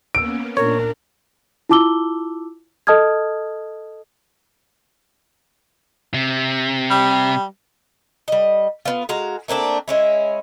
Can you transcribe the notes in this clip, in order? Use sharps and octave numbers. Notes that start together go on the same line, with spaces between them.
A#3 B3 C#4 E6 D7
A#2 D4 A#4 C#5
E4 F4 A5 D6 E6 G7
A4 D#5 A5 D#6 F6 G#6
C3
G3
G3 D#5
B3 F4
G#3 F#4 F5 A#5
A3 A#3 C4 D4
G#3 C#4 E4